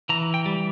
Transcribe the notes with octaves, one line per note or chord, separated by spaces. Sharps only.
E3 A#5
G5
G3